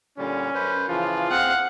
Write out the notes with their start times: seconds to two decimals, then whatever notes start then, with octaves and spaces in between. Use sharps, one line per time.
0.18 A#2 D3 G3 C#4
0.54 F#2 B4 C5
0.89 C#3 E3 F3 F4
1.30 C4 G#4 F5 F#5